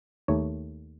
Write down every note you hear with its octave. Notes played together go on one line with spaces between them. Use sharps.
D#2 D#3 A3 C#5